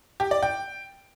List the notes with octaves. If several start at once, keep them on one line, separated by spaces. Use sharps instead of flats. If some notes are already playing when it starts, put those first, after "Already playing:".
G4
D5
G5